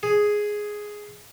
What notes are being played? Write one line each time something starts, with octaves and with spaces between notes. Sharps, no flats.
G#4